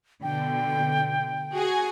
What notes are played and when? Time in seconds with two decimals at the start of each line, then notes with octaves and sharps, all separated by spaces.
0.23 B2 D3 G5
1.55 F#4 G#4 G#5